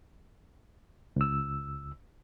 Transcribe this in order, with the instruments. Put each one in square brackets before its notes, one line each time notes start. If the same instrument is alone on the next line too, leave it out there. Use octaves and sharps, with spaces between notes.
[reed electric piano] C#2 E6